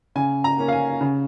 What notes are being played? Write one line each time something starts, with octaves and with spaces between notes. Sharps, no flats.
C#3 G#5
A#5
A#3 C#4
F5
G#5
C#3